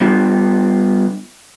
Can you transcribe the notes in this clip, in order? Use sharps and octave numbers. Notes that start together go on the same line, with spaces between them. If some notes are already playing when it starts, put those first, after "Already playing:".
G3 B3 F4